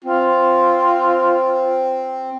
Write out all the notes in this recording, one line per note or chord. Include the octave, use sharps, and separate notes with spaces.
C4 F4